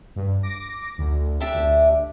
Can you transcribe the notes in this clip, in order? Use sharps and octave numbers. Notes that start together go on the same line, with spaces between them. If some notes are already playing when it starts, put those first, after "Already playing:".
G2
D6 A#6
D2
D4 G4 E5
D2